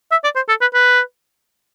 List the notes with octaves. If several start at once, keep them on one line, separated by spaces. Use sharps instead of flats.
E5
D5
C5
A4
B4
B4